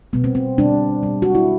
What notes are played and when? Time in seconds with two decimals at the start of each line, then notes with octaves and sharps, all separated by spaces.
0.13 B2 G3 B3
0.24 C4
0.35 C4
0.58 B2 G3 D4
1.03 B2 G3
1.22 F#4
1.35 E4